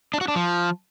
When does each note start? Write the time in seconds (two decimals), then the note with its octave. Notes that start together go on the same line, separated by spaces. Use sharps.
0.14 D4
0.21 F#4
0.28 D4
0.36 F3